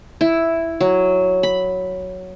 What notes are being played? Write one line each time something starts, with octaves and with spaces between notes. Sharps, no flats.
E4
F#3
B5